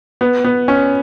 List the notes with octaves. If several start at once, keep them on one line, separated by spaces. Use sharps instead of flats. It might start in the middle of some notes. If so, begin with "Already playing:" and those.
B3
B3
C#4